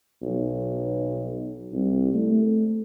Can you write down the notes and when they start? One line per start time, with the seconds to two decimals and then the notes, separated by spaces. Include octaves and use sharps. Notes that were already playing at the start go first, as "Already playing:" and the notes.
0.22 B1
1.72 C2
2.14 A3